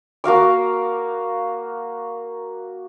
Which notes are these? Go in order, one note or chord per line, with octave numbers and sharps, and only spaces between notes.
A#3 F#4 F5 D6